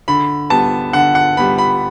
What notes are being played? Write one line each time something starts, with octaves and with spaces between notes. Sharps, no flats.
D3 B5
G3 B3 A5
D3 F#5
F#5
G3 B3 B5
B5